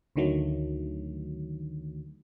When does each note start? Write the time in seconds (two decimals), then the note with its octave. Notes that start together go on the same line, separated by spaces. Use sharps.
0.16 D2 D3 D#3 F#3 A3